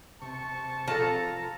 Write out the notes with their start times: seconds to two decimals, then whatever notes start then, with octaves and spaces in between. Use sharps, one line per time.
0.22 C3 A5 C#6
0.88 F3 A4 A5 A#5